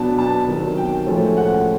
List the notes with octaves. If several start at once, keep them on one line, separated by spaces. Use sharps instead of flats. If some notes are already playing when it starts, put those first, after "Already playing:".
Already playing: B2 F#3 B3 D4 A5
A5
C3 D#3 F#3
G5
A2 F3 G#3 C#4
F#5